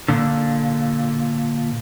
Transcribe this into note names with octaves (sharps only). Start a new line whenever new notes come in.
A#2 D3